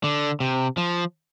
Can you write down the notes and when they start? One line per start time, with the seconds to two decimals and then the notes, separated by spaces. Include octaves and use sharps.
0.04 D3
0.40 C3
0.77 F3